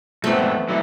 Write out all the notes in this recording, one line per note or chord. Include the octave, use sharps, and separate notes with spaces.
E2 G#2 A3 B3 C4
F#3 A3 E4